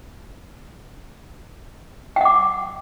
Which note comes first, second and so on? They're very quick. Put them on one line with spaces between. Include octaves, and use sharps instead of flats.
G5 F#5 D6